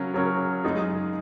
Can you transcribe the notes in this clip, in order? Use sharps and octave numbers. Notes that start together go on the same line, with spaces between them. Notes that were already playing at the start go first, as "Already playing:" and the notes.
Already playing: C#3 F#3 C#4 A#4
C#3 F#3 C#4 A#4 C#5
F#2 C#3 G#3 D#4 G#4